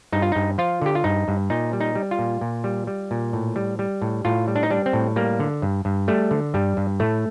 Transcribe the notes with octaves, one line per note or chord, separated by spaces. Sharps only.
G2 D#4
F4
G2 D#4
F3 F4
D3 G4
F4
G2 D#4
G2
A#2 D#4
G3
D#4
G3
F4
A#2
A#2
G3
G3
A#2
A2
G3
G3
A2
A2 F4
G3
D4
D#4
G3 D4
C4
A2
G3 A#3
D3
G2
G2
G3 A3
D3
G2 G3
G2
A2 A3